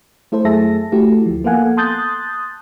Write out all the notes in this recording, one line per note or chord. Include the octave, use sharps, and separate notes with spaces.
A3 E4 A4 C5
F#2 A3 G#4 E5 A5 A#6
A3 E4 F#4 G4
D2 F3
A#3 B3 A4 F5 F#5 G#5
A5 C6 D#6 F#6 G6 A6